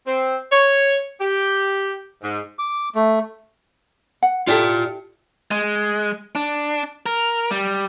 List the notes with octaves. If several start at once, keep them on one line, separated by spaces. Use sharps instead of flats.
C4
C#5
G4
G#2
D6
A3
F#5
E4 F4 G4 A4 D5
G#3
D4
A#4
G3